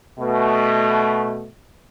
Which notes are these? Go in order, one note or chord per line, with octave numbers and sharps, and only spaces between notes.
B2 A3